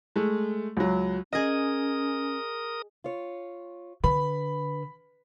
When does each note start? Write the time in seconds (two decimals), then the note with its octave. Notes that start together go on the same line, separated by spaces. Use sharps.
0.16 G#3 A3
0.77 C#2 F#3
1.33 C#4 G#4 A#4 D#5 D#6
3.04 F4 C#5
4.04 D3 B4 B5